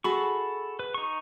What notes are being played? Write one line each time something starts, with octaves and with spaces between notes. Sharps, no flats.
F#4 G#4 A4 B5 C#6
B4
D#4 C#6